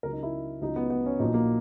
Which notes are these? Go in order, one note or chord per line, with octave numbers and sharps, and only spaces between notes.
C#2 C#3 F#3 A#4
D#4
E4
C#2 C#3 F#3 D#4
B3
B3
C#4
A#1 A#2 F#3 D#4
A#3